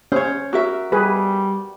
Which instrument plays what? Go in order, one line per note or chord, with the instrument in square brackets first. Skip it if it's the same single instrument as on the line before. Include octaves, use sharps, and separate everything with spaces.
[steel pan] C#4 [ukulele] C5 C#5
[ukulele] F#4 A#4 E5
[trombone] G3 [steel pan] G#4 B4